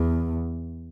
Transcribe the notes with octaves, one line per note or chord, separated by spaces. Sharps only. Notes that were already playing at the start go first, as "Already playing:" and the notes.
Already playing: E2